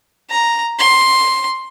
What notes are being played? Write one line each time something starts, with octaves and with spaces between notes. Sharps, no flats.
A#5
C6